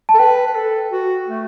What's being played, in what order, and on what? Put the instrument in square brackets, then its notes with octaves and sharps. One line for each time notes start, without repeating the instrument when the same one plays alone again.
[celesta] A5
[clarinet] A4
[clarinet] B4 [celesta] G5
[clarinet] B4
A4
F#4
A3